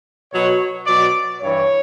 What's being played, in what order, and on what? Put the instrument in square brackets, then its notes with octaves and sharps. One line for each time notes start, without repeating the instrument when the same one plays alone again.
[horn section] B2 F#3 C#5
B2 F#3 D5
G2 E3 C#5